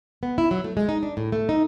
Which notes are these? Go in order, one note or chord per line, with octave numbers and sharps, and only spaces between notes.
B3
E4
F#3
A3
G#3
D#4
D4
A2
A3
D#4